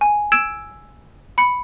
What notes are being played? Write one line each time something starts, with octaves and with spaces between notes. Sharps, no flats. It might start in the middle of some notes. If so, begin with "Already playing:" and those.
G#5
E6 G#6 D7 E7
B5 C#7